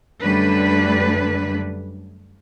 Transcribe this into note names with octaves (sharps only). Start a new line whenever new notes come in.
F#2 D3 G3 A3 D4 B4